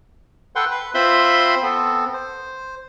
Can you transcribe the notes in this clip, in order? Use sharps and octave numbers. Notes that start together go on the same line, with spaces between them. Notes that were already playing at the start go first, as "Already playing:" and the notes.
A4 B4 F#5 G5 C6
B4
C4 F4 C5 E5 B5 C6
B3 C4 A4
C5